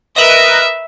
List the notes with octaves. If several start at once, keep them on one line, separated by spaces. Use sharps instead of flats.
A#4 B4 D#5 E5